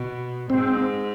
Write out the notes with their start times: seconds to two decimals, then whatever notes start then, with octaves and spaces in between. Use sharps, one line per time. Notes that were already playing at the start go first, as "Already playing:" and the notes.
Already playing: B2
0.50 G#2 C4